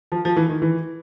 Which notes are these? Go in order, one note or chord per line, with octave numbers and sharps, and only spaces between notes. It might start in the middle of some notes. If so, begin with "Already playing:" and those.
F3
F3
E3
D#3
E3